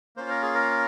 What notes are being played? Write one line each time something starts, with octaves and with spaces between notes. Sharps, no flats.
A#3 C#4 F4 C5
A#4
G#4
A#4